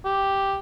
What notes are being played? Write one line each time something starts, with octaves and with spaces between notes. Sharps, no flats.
G4